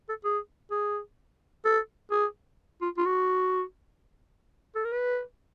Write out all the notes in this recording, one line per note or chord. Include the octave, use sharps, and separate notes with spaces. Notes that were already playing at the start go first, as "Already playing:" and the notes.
A4
G#4
G#4
A4
G#4
F4
F4
F#4
A4
A#4
B4